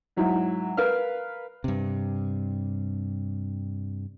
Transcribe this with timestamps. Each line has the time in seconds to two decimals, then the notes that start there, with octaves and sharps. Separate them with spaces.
0.17 G#2 F#3 E4
0.77 A#4 B4 F5 F6
1.64 G2 C3